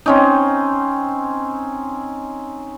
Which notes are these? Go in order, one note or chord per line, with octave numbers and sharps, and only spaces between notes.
C4 C#4 D#4